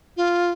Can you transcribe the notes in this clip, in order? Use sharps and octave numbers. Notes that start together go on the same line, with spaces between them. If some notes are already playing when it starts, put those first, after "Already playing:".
F4